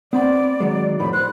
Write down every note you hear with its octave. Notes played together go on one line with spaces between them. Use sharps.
B3 C4 D5 B5
D#3 F#3 G#3
F2 A2 D#3 B5
C5 F#6